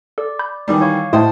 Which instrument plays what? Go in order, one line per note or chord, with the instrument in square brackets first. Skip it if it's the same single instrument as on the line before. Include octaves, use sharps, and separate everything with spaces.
[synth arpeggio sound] A4 [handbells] D5
[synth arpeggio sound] B5 G6
[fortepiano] D#3 E3 G3
[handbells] C#5 F5 C#6
[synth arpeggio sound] A2 A3 [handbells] E4 A5 [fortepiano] C5 D#5 G5